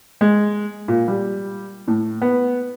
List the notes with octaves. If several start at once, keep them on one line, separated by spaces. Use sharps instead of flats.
G#3
A#2
G3
A2
B3